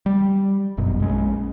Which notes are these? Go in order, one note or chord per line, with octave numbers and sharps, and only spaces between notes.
G3
G1 F#2 B2
A#1 G#3 C#4